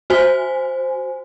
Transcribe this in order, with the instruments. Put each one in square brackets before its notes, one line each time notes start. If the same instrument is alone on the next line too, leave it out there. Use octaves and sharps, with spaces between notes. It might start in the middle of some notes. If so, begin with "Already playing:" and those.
[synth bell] F#4 C5 G#5